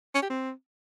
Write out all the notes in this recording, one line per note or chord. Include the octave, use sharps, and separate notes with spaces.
C#4
G4
C4